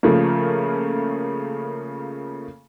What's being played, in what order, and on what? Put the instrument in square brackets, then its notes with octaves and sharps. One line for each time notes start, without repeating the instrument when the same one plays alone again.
[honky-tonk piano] C#3 F3 A3 A#3